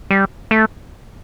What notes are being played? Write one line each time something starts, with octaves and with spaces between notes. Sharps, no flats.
G3
A3